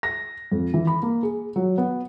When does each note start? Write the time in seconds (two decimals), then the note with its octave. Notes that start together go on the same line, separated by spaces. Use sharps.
0.03 A#6
0.52 F2
0.74 E3
0.87 B5
1.02 A#3
1.23 G#4
1.56 F#3
1.78 B3